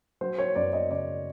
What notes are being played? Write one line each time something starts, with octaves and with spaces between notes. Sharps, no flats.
F#3 C5
C#5
F#2 D5
D#5
C#3 D5